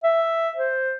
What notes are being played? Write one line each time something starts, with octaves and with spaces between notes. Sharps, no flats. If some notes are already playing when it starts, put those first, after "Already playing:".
E5
C5